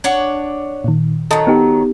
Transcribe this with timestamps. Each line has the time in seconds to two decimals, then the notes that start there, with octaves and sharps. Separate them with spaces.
0.04 D4 C#5 F#5
0.84 A#2 D#3
1.31 D#3 F#3 A4 D#5 A5
1.47 B3 D#4 G4